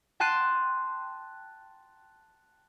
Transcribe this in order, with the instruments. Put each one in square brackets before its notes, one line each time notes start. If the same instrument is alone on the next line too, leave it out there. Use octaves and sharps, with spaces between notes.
[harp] G5 A5 C6 F#6 C7 D#7